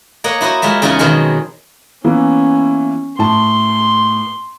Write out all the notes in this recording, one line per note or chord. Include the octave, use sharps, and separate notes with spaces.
A#3 C#5 D#5 F#5
E4 F#4 C5 D#5
G#3 F4 F#4 E5
E2 C#3 D#4 F4 F#5 G#5
B2 D#3 F#3 G#3 C4
E3 A#3 B3 C#4
A2 A5 C6